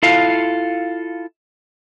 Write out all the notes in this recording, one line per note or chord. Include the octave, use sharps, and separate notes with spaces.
E4 F4 A4 F5